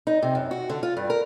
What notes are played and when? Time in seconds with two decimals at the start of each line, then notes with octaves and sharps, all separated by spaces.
0.07 D#4
0.23 C3
0.35 F#2
0.51 F#4
0.69 D3
0.83 F4
0.97 G2
1.10 A#4